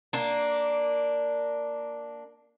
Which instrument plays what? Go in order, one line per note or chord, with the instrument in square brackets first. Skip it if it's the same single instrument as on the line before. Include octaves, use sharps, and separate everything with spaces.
[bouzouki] A#3 D4